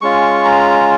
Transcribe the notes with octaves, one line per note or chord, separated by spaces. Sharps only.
G#3 C#4 F4 C#6
A#5